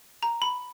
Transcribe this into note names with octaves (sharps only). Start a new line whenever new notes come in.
A#5
B5